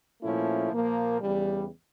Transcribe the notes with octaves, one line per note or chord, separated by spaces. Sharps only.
A#2 F3 A3 C#4 E4
A#2 F3 A#3
E2 C#3 G3